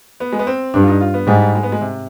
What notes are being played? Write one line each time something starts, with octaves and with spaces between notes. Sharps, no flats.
B3
G#3
B3
C4
G2 D4
F4
D#4
F4
B3
G#2 G3
G#3
B3
G#3
C3